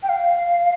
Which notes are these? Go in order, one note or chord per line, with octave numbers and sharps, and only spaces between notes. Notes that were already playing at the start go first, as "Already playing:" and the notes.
G5
F5